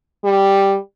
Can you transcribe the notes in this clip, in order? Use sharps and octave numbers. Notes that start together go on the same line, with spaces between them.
G3